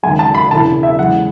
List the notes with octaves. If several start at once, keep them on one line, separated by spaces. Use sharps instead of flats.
D#2 C#3 G#3 G#5
A5
B5
E1 E2 C#3 E3 A5
E5
E2 C#3 G#3 F#5